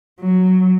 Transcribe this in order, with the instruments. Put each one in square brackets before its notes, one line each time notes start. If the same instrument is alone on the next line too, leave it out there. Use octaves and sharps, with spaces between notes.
[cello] F#3